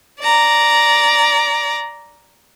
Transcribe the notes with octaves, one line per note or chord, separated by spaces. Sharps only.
D5 A#5